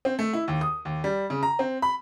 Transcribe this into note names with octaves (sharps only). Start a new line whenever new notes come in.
C4
A3
E4
D#2
D#6
D#2
G3
C#3
A#5
C4
B5